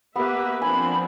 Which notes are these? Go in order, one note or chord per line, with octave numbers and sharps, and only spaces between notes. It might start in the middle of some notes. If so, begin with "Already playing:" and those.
A#3 B3 G4 B4 E5
F3 C4 D4 G#5 B5